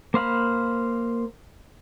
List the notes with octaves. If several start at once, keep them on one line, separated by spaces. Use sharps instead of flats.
A#3 C5 F5 B5